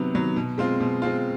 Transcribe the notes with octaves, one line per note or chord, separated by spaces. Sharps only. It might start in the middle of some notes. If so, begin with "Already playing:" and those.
Already playing: C3 D#3 F#3 B3
D#3 F#3 B3
B2
G#3 C4 F4
B2
G#3 C4 F4